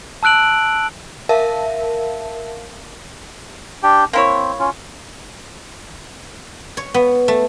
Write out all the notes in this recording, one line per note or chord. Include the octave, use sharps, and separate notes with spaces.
A5 E6 F#6 D7 F#7
A#4 E5 F5 A5
D4 G4 G5
A#3 C4 E4 C#5
C#4 F4
C#5
B3
A3